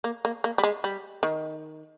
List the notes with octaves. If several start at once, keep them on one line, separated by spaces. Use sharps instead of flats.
A#3
A#3
A#3
G3
G#3
G3
D#3